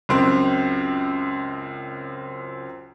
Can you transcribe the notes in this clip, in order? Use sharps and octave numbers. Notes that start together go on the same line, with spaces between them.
C#2 F#2 C4 C6